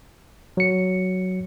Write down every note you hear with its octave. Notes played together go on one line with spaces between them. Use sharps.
F#3 C#7